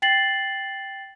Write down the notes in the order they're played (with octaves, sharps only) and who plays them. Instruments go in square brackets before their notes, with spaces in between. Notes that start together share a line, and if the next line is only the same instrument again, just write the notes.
[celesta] G5 A6 C7 F#7